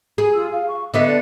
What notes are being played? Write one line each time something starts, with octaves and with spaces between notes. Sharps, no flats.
G#4
F4 E6
F5
C#6
D3 B3 D#5 E5
A4 D5